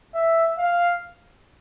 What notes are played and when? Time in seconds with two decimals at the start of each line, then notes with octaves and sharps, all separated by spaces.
0.14 E5
0.58 F5